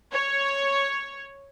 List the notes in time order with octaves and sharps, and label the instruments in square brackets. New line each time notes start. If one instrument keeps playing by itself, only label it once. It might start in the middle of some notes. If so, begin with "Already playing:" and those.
[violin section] C#5